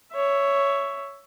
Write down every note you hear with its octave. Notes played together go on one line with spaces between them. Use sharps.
C#5 E5